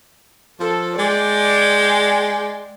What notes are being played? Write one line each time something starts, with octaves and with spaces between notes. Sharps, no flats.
F3 A4
G#3 D5 G5